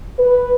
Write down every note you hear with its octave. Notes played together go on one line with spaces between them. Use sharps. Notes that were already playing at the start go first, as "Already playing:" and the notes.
B4